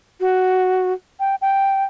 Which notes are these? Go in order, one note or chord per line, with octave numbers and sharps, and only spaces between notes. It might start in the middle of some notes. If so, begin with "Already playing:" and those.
F#4
G5
G5